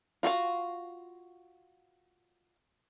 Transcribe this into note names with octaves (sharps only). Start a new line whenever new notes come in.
F4 F#4 G#4 F5